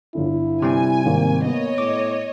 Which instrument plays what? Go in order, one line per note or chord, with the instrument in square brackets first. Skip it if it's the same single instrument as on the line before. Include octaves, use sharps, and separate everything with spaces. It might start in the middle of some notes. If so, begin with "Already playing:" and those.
[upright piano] G1 D3 [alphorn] E4
[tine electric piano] C3 G3 C4 [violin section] G#5
[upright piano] G#1 [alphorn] A#3
[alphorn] A#3 [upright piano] B3 [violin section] C#5 D#5
[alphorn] A2 [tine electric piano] D6